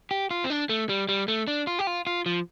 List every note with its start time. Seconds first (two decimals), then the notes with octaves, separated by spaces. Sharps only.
0.11 G4
0.31 F4
0.44 C4
0.50 D4
0.69 A3
0.89 G3
1.09 G3
1.28 A3
1.48 D4
1.67 F4
1.79 G4
1.87 F4
2.07 F4
2.26 F3